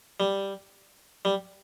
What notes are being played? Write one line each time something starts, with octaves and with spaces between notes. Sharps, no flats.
G3
G3